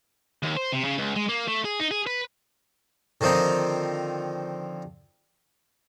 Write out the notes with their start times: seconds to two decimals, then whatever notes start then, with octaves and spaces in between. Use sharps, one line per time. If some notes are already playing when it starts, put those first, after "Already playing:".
0.43 D#2
0.57 C5
0.72 C3
0.84 C#3
0.98 C#2
1.16 G#3
1.29 A#3
1.48 A3
1.65 G#4
1.80 D#4
1.91 G#4
2.07 B4
3.21 D3 D#3 F3 C4 D#4